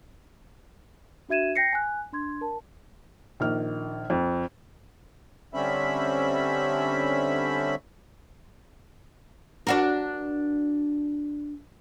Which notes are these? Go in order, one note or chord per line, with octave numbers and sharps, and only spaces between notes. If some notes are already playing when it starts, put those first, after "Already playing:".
D4 F#4 E5 G#6 D#7 E7
G5 G6 A#6 C7 C#7
G#5 F#6
D4 C6 G#6
A#4 A5
A#1 D#3 F6
F2
D3 G3 C4 C#4 E5 B5
D4 F#4 A#4